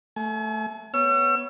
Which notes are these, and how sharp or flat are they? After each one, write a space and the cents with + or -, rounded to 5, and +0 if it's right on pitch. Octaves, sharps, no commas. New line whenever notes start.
A3 +0 G#5 +40
B3 +0 C#5 +5 E6 +45